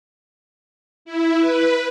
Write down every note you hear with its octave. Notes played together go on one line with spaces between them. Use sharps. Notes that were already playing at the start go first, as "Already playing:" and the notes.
E4
B4